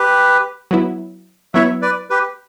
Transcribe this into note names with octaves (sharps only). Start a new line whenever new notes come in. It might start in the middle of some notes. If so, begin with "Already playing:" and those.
Already playing: G4 B4
F#3 B3 E4
F#3 B3 E4 C#5 E5
B4 D5
G4 B4